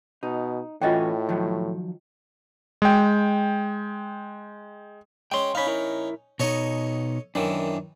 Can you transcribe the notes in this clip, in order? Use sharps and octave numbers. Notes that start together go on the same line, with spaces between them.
B2 D#4
A2 E3 C#4 F4 F#4 D#5 G5
D#3 F3 F#3
G#3 G5
G#3 C#4 G5 C6
C#4 D#4 F5 B5
E4 A#4
B2 D#4 A4 C#5 D#5
F#2 D#3 E3 D4 E4